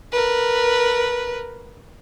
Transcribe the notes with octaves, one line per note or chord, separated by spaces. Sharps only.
A#4 B4